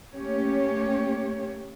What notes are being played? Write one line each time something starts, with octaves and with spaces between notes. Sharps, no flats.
A3 A#3 C#4 G4 C#5